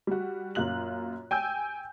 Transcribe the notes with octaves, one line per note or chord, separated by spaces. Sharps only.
G3 F#4
F#2 A#2 F4 F#6 F#7
G5 G#5 E6 G6